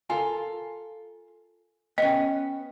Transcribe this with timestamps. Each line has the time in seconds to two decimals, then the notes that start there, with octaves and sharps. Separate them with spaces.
0.10 F4 A4 A#4 G#5
1.98 B3 C#4 D#5 G5